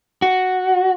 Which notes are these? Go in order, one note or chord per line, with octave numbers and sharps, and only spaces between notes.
F#4